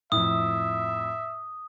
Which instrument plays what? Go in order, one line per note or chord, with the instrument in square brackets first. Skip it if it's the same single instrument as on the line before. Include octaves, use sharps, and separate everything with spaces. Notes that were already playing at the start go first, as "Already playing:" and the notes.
[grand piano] F2 A2 [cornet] E5 [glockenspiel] D#6